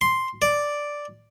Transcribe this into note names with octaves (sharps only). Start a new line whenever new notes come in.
C6
D5